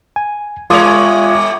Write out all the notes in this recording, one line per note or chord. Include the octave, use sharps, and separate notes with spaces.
G#5
G3 F4 C#5 D#6